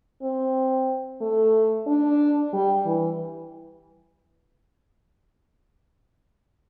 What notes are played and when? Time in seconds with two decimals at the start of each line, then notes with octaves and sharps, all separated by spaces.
0.22 C4
1.21 A3
1.87 D4
2.53 G3
2.85 E3